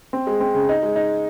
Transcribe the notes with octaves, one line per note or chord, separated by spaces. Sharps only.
C4
G#3
C4
C#3
D#4
G#3
D#4